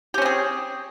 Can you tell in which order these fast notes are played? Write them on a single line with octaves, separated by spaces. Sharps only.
G4 C#4 C4 G#4